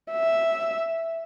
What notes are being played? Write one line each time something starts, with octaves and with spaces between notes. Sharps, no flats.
E5